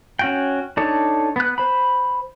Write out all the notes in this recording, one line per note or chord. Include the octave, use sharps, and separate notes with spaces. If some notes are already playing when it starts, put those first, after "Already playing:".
C#4 F#4 G5
D4 D#4 A4 C#5
B3 F#6
C5 B5